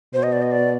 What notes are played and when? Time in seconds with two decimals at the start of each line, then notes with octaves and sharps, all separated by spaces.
0.14 B2 C5
0.23 D#5
0.33 D5
0.42 D#5
0.52 D5